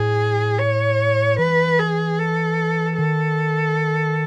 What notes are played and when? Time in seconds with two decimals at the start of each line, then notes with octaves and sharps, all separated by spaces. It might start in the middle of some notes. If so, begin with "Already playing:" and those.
Already playing: A2 G#4
0.59 C#5
1.39 E3 B4
1.79 G#4
2.19 A4
2.99 D#3 A4